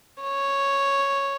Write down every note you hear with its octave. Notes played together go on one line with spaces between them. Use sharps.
C#5